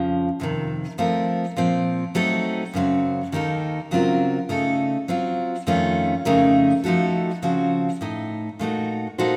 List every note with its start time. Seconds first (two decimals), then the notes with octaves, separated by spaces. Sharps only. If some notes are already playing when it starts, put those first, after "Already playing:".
Already playing: F2 C#3 F3
0.40 F2 C3 D#3
0.98 F3 A3 C4 F4 A#4
1.57 A#2 F3 C4
2.15 F#3 A3 C4 D#4 A4
2.74 F#2 C#3 F#3 C4
3.32 D#2 D#3 A#3 D#4 A4
3.91 C#3 F#3 C4 F4 A#4
4.49 C#3 A3 D#4 A4
5.08 F#3 C4 F4
5.67 F2 D#3 A3 C#4 F4
6.25 F2 C#3 A3 D#4 A#4
6.84 F3 A3 D#4 F#4 A4
7.42 C#3 F3 C4 F#4
8.01 A2 A3 D#4
8.59 A#2 A3 D#4 F#4
9.18 A#2 A3 D#4 F#4 C5